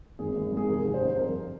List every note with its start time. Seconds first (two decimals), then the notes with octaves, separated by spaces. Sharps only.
0.19 G#1 G#4
0.36 G#1
0.52 G#2
0.57 G#4
0.68 F1 A#4
0.85 F1
0.94 C5
1.01 F2
1.08 C5
1.18 G1 A#4